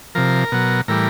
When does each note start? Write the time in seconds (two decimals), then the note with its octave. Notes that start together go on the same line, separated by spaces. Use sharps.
0.15 C3 F3 A#4
0.52 B2 F#3
0.88 A2 E3 G3 A#4